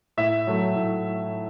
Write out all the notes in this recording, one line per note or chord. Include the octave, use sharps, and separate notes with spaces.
A2 E5
F#3 A3
A2